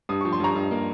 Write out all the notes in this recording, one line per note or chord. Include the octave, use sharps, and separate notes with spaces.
G2 D#6
F3 C#6
C6
G2 A#5 C#6
G2
A#3